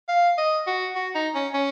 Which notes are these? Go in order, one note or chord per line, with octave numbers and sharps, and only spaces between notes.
F5
D#5
F#4
F#4
D#4
C#4
C#4